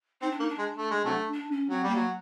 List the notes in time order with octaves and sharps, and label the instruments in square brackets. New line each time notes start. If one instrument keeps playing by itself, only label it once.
[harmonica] C4 [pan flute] D#4
[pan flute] D4
[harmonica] A#3 [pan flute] D#4
[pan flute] D4
[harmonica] G#3
A3
G#3
C3 F#3 A3
[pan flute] D4
C#4
[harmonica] F#3 [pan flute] C4
[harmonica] G3
[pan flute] A#3
[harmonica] F#3